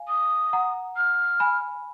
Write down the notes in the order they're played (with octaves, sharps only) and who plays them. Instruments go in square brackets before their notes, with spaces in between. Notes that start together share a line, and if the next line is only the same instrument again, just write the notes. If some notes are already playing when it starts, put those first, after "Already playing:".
Already playing: [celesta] F5 G#5
[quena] D#6
[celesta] F#5 A#5
[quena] F6
[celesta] G#5 B5